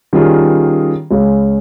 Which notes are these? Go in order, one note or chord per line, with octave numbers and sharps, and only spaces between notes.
D#3 G3 C#4 F4 G#4
C#2 C#3 G#3